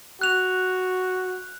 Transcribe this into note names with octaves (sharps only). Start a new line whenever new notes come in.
F#4 F#6 F7